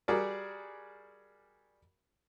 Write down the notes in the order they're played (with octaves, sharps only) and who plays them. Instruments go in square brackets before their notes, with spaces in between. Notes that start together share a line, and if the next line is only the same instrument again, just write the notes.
[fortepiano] G3 F#4 G#4 A#4 D5